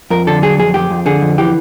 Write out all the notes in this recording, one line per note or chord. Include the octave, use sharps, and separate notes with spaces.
F2 A#4
D3 A4
F#3 G#4
F2 G#4
F2 G4
F2
D3 G#4
F2
E3 G4